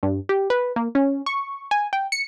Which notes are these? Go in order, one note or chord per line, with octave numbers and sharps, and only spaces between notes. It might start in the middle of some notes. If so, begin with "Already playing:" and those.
G2
G4
B4
A#3
C#4
C#6
G#5
G5
C#7